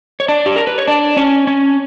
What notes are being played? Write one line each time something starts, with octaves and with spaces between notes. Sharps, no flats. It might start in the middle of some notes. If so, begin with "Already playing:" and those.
C#5
D4 D5
G4
A#4
B4
C#5
D4 D5
C#4 C#5
C#4 C#5